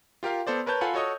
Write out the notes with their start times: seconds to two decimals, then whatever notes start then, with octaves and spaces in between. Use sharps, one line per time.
0.23 F4 G4 A#4 F5
0.47 B3 A4 C5 D5
0.66 A#4 B4 C#5 A5 G6
0.81 F4 A4 F5 F#5 G#5 B5
0.94 F#4 A4 C#5 D#5 D#6